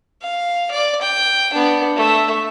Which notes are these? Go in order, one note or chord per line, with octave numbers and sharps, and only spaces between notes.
F5
D5
G5
B3 D4
A3 E5